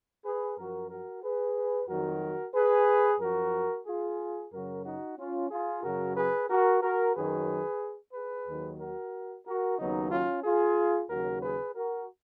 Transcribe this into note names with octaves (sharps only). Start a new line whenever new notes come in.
G#4 B4
F#2 F3 F#4 A#4
F#4 A#4
G#4 B4
F2 D#3 F#3 F#4 A#4
G#4 B4
F#2 F3 F#4 A#4
F4 G#4
F#2 C#3 F#3 F#4 A#4
D#4 F#4
C#4 F4
F4 G#4
F#2 C#3 F#3 F#4 A#4
G#4 B4
F#4 A#4
F#4 A#4
F#2 D#3 F#3 G#4 B4
G#4 B4
D#2 D#3 F#3
F#4 A#4
F#4 A#4
D#2 C#3 F#3 B3 D#4
C#4 F4
F4 G#4
D#2 C#3 F#3 F#4 A#4
G#4 B4
F#4 A#4